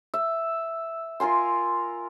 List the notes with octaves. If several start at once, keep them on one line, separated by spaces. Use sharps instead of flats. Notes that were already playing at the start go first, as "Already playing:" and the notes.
E5
F4 A#4 G#5 C6